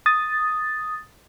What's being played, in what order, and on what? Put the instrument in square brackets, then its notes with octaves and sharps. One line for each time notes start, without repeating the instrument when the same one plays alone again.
[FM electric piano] D#6 A6